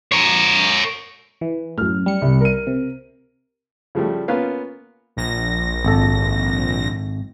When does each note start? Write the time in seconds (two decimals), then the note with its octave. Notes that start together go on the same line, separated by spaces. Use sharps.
0.12 A#4 C#5
1.41 E3
1.78 F#2 A2 F6
2.06 G3 C#7
2.22 C2
2.41 A#4 D#7
2.67 C3
3.95 C#3 F3 G3 A3
4.28 A#3 B3 C#4 F4 B4 F5
5.17 A#1 A#6
5.84 G#1 A4